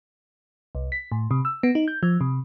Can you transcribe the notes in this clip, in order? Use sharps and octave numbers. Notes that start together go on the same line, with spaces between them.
C2
B6
A2
C3
E6
B3
D#4
G6
F3
C3